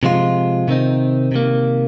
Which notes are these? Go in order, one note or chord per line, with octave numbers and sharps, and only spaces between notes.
C3 F3 G#3 F4
C3 D#3 C4 D#4
C3 D#3 A#3